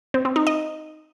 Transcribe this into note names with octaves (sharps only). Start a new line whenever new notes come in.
C4
C4
D#4
D#5